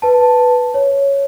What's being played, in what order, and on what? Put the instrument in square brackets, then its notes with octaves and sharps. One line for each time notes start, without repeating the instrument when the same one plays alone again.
[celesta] B4 A5
C#5